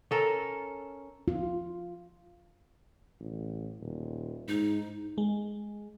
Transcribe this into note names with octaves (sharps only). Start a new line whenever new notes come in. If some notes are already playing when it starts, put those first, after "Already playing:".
C#4 A4 A#4
F4
A1
D#1
G#2 D#4
G#3